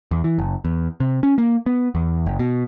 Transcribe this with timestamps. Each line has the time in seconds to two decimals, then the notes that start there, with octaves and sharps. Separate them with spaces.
0.11 E2
0.24 E3
0.39 F#1
0.65 E2
1.00 C3
1.23 C#4
1.38 A#3
1.66 B3
1.95 E2
2.26 F#1
2.39 B2